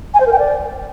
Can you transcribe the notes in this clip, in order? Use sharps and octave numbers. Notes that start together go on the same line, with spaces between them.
G#5
C5
A#4
G5
D5